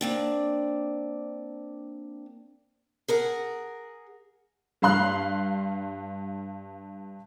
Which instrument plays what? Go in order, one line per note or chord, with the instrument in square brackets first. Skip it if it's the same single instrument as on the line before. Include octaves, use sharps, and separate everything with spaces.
[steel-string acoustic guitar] A#3 C4 D4
G#4 A#4 F#5
[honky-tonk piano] G2 F5 C6 F#6